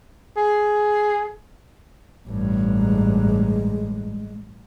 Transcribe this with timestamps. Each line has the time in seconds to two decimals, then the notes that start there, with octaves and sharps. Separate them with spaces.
0.37 G#4
2.28 A1 G2
2.76 G#3